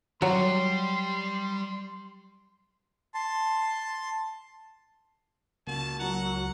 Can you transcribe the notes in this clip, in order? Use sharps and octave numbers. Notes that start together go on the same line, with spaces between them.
F#3 G3 G4 C6
A5 C6
C#2 A#3 F#4 A5
F#3 A#4 F#5